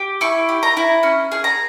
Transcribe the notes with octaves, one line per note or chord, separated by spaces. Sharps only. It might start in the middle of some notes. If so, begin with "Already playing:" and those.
Already playing: G4
E4 C#6
G4
A#5
E4
C#4
G#4
A#5